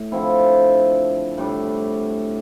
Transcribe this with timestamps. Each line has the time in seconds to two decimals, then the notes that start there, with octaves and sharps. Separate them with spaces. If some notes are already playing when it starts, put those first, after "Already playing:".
Already playing: A2
0.12 D3 F3 C4 E4
1.38 A2 G3 D4